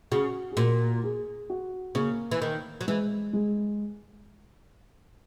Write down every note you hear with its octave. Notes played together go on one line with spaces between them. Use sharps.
C#3 F#4
G#4
A#2 F#4
G#4
F#4
C#3 A#3
E3
D#3
F#3
E3 G#3
G#3